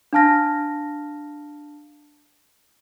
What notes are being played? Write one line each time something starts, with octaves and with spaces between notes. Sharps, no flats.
D4 F5 A5 F6 A#6